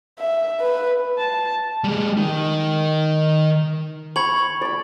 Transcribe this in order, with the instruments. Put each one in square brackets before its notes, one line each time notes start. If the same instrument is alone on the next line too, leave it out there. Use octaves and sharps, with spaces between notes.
[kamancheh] E5
B4
[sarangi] A5
[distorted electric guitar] G3 G#3
D#3
[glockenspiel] B5 G#6 F#7 [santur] C#6
[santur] D5 B5